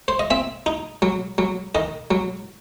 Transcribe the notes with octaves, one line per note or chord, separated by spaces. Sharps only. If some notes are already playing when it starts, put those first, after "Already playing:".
C5
D#5
C4 E5
D#4
F#3
F#3
D#3 D#5
F#3